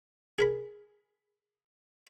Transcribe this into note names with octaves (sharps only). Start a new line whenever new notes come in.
G#4 A#4 B5